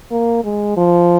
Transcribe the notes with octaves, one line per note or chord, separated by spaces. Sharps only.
A#3
G#3
F3